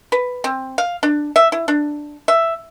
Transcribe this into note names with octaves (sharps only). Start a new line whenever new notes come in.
B4
C4
F5
D4
E5
E4
D4
E5